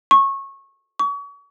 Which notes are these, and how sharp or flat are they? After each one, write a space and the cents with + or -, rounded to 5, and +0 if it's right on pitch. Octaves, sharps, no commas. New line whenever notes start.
C#6 -20
C#6 +35